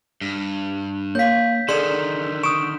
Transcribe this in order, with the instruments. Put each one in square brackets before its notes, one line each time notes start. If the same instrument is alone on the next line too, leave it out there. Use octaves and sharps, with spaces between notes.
[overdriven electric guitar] G2
[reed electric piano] A#3 [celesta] C#5 F5 [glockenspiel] G6 B6
[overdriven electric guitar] D3 D#3 [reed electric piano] G#4 [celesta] A4 D5 [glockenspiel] C6 E7
[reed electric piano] C#6 D#6 [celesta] D7 [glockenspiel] E7